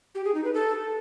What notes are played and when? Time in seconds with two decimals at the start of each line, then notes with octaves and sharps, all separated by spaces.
0.15 G4
0.25 G#4
0.35 D#4
0.44 B4
0.54 A4